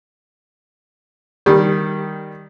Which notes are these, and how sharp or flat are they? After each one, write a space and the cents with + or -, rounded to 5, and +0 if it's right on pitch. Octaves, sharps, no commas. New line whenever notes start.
D#3 +0 G3 +5